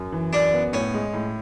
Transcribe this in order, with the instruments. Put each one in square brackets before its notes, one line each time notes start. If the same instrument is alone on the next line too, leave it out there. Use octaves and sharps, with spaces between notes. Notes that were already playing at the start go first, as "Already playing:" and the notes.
Already playing: [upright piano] F#2
E3
[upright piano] F#2 [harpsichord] D4
[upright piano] B3
[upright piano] A2 [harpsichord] C#4
[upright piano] G#3
A2